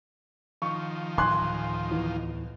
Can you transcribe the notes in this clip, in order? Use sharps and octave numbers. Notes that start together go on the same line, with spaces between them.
D#3 F3 C#6
D1 G#5 C6 F#6
E2